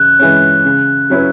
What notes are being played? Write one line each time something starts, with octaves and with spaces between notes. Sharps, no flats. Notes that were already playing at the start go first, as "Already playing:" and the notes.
Already playing: C#3 E3 F#6
E3 G#3 C#4
C#3
F#3 C#4 E4 B4